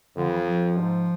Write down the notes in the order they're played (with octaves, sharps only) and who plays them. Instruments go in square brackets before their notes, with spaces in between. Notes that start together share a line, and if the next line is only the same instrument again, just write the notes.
[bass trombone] F2 [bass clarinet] D3
[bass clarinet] E3
F3
F3
[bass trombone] G#2